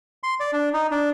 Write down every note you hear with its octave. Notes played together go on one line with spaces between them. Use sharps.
C6
D5
D4
D#4
D4